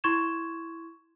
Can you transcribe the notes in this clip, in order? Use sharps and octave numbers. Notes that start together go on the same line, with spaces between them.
E4 C6 C#6 G#6 E7